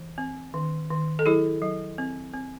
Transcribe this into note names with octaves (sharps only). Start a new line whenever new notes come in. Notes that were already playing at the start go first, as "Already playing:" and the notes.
Already playing: E3
C4
D#3
D#3
A4
F#3 E4 G#4
F#3
C4
C4